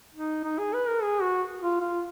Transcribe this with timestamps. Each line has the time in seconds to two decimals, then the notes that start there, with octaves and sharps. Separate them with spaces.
0.14 D#4
0.44 D#4
0.59 G#4
0.74 B4
0.88 A#4
1.02 G#4
1.22 F#4
1.62 F4
1.81 F4